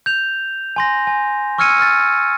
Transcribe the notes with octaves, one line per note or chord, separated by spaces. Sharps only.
G6 F7
G#5 C6 A#6
G#5
C#6 E6 F6 G#6 C#7 D#7
F6 A6